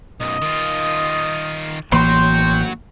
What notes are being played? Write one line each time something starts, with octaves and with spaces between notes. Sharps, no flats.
B1 F#2 D#5
D#3 F4
A1 E3 F#3 A#3 F#4 G5 C6